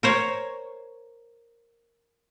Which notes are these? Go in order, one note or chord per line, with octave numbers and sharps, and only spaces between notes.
A#4 C5 C#5